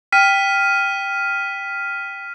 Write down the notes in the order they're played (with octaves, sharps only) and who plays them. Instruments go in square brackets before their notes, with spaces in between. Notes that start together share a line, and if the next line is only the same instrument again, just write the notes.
[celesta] G5 [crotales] F6 B6 D#7